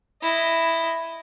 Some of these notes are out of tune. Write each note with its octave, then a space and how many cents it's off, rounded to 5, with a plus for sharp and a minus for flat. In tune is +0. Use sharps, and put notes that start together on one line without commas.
E4 +0 D#5 +0